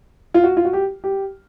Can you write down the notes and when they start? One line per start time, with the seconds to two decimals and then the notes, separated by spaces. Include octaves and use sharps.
0.34 F4
0.44 F#4
0.57 F4
0.65 F#4
0.73 G4
1.04 G4